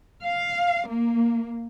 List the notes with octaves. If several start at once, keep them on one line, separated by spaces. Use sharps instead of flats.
F5
A#3